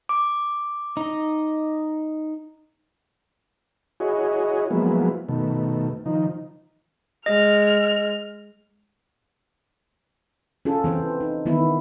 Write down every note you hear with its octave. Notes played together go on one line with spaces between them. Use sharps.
D6
D#4 D#5
E4 F#4 G#4 C#5 D#5
F3 F#3 G#3 A#3 B3 E4
B2 D#3 A3
D#3 F3 D#4
G#3 D#5 F6
C#4 F4 A4
E3 C4 C5
D#4
D#3 E3 B3 E4